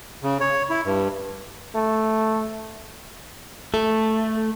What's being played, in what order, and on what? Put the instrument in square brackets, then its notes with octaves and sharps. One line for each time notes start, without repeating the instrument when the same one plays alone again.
[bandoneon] C#3
C#5
E4
G2
[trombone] A3
[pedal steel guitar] A3 [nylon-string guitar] A4